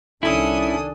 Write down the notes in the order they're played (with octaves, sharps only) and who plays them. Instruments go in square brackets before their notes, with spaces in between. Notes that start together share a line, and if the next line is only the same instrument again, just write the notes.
[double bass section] C2 D#3 [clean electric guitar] C#4 E4 [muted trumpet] D4 [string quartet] A4 G#5 D#6